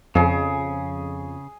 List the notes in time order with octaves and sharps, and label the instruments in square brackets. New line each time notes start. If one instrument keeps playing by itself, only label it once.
[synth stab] F2 [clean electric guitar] C#3 [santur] G#4